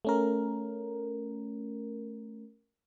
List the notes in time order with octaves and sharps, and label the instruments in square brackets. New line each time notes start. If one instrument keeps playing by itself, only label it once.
[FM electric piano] A3 C#4 A#4